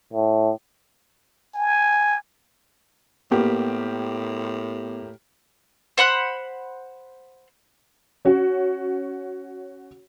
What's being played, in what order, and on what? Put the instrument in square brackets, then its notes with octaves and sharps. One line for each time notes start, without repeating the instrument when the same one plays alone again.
[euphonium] A2
[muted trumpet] G#5
[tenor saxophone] A2 [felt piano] A#3 G4 [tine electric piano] B3
[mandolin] C5 F#5 B5 F#6
[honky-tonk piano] C#4 F#4